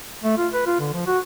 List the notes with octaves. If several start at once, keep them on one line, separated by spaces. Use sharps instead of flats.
A3
F4
B4
F4
D3
F3
F#4